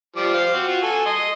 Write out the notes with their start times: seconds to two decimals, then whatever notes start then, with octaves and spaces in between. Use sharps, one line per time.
0.16 F3 G3 D6
0.34 C5 F5
0.54 C4 F#4
0.68 F4 F#4
0.83 A4 G#5
1.06 D#5 C6